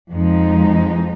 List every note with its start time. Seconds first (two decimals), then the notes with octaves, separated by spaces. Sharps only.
0.11 F2 F3 G#3 D#4